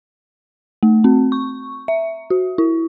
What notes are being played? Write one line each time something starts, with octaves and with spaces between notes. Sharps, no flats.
A3
C4
C#6
E5
F#4
E4